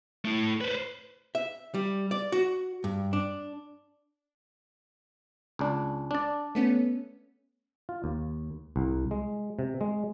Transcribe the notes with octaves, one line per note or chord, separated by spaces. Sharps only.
A3 E4
B4 C5
E5
G3
D5
F#4
G2
D4
C#2 D4
D4 D5
A3 B3 C#4
F4
D#2
C2
G#3
C3
G#3